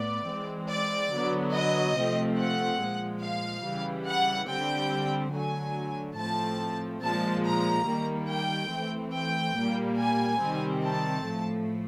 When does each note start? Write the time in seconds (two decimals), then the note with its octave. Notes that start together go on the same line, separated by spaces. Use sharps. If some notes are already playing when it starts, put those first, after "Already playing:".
Already playing: A2 B3 D5
0.26 E3 G#3 C4
0.69 D5
1.11 D3 F#3 B3
1.54 D#5
1.95 C3 F3 A3 C4
2.38 F#5
2.80 A#2 F3 G#3
3.22 F5
3.64 C#3 E3 G3
4.07 F#5
4.49 D3 G3 C4 G5
5.33 D3 F#3 A3 G#5
6.18 A2 F3 A3 C4 A5
7.02 A#2 F3 G#3 A5
7.45 A#5
7.87 D#3 G3 A#3
8.29 G5
8.72 E3 A3 C4
9.14 G5
9.56 A#2 G3 A#3
9.98 G#5
10.40 C3 D#3 G3 C4
10.83 A5
11.25 A2 F3 A3